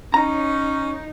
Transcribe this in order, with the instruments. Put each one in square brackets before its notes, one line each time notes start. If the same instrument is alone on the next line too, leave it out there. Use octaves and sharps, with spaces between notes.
[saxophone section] C#4 [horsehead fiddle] D#4 [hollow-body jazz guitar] A#5